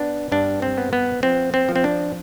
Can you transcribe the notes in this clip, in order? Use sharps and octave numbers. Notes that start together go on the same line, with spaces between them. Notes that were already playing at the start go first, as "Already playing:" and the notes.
Already playing: B3 D4
G2 D4
C4
B3
B3
F3 C4
C4
F3
C4
D4